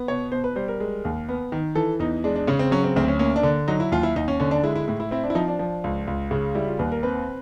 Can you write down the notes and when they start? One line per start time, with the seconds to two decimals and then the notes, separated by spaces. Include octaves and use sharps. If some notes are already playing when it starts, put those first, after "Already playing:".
Already playing: B3
0.08 B2 C#5
0.32 B2 C5
0.44 B4
0.56 G3 C5
0.68 A#4
0.80 G#3
1.05 D#2
1.29 B3
1.52 D#3
1.75 E3 A4
1.99 E2 D#4
2.24 G#3 D4
2.35 D4
2.47 C#3 C#4
2.59 C4
2.71 F#3 C#4
2.84 C4
2.96 D2 C4
3.08 C#4
3.19 A#3 C#4
3.36 D4
3.43 D3
3.68 F#3 D#4
3.80 E4
3.92 D#2 F4
4.03 E4
4.16 D#2 D#4
4.28 C#4
4.40 D3 C#4
4.51 D4
4.63 G#3 E4
4.76 E4
4.88 A2 E4
5.00 E4
5.11 C4 E4
5.23 D4
5.30 E4
5.35 F3 D#4
5.48 D4
5.59 F3
5.84 C#2
6.07 C#2
6.31 C#3
6.55 G3 E4
6.68 F4
6.79 D#2 B4
6.92 A#4
7.03 C4 B4